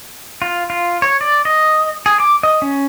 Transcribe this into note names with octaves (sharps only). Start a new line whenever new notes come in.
F4
F4
C#5
D5
D#5
G#4
D6
D#5
C#4